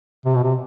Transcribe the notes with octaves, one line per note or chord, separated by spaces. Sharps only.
C3
B2
C3